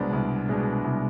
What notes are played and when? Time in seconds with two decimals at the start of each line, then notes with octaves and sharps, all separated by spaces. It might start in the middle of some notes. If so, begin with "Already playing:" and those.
Already playing: C2 B2 G#3 B3 D4 A#4 C5 D5
0.13 C2
0.48 B2 G#3 B3 D4
0.84 C2